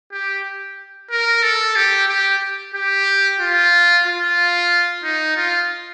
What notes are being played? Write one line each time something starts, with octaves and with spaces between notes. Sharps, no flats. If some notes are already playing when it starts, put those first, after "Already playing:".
G4
A#4
A4
G4
G4
G4
F4
F4
D#4
F4